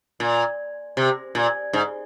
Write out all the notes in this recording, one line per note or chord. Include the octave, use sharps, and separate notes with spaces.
A#2
C3
A#2
G#2